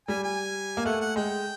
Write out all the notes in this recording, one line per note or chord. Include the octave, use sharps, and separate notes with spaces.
G3 G#5
G#5
A#3
A3 F#5
F#5
G#3 G5